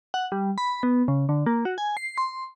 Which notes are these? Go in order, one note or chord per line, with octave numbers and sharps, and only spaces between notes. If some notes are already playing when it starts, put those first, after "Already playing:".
F#5
G3
B5
B3
C#3
D3
A#3
F#4
G#5
C7
C6